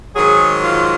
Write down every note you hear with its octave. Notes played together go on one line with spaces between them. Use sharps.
G#2 D#3 F#3 G#4
F4